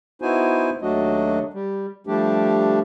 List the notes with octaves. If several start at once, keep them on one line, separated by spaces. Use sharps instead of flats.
B3 D#4 E4 F#4 C5 G#5
D#2 F#3 A3 D4 F#4 D#5
G3
F3 G3 A3 D4 G4